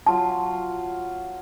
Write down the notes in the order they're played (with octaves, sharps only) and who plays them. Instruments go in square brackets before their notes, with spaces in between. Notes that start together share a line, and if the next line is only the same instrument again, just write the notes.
[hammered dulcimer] F#3 F4 [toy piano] A5